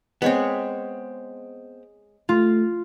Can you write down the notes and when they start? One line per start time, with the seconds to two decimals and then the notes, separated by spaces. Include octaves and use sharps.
0.22 G#3 B3 C4 C#5
2.29 A3 F4